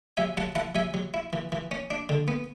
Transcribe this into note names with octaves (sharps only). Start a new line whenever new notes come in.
F#3 E5 G#5
F#3 F#5 A5
E4 F#5 A5
F#3 E5 G#5
F#3
E4
E3
E3
C#4
D4
D3
B3